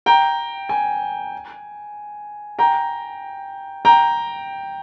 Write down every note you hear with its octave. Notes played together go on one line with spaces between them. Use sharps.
G5 A#5
G#5
G5 A#5
G5 A#5